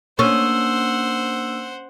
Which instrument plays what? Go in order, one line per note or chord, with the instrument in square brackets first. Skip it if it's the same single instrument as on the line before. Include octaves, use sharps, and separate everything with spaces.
[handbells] A#3 D4 [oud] C#4 [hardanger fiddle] C5 F#5 [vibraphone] E6